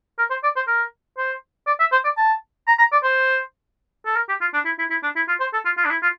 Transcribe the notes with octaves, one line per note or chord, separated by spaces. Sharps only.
A#4
C5
D5
C5
A#4
C5
D5
E5
C5
D5
A5
A#5
A#5
D5
C5
A4
A#4
G4
F4
D4
E4
E4
E4
D4
E4
F4
C5
A4
F4
F4
D4
E4
F4